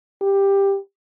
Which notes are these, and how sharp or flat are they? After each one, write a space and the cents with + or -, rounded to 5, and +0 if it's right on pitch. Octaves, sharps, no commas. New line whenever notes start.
G4 +10